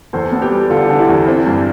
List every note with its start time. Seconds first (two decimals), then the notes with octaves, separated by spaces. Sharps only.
0.13 E2 A4 C5
0.32 B3 A4
0.41 G4 B4
0.51 G3
0.70 D3 F4 A4
0.90 D3
0.98 E4 G4
1.09 E2
1.27 C4 E4
1.46 G2